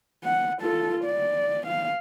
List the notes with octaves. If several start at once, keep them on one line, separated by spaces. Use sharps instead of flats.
F#5
F4 A4
D5
F5